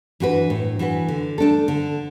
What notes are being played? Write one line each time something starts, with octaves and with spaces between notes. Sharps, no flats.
E3 D4 F#4 B4
A2
E3 D4 F#4 B4
D3
A3 D4 A4
D3